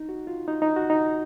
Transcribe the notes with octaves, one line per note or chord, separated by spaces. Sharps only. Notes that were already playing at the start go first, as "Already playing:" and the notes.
Already playing: D#4
F#4
F4
D#4
D#4
F#4
D#4